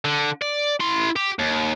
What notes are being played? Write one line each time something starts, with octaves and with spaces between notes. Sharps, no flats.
D3
D5
E4 C6
G4
D#2